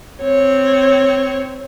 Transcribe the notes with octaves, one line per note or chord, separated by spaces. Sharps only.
C4 C#5